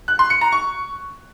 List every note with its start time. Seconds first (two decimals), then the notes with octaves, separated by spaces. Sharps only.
0.08 F#6
0.19 C6
0.30 C#7
0.41 A#5
0.52 C#6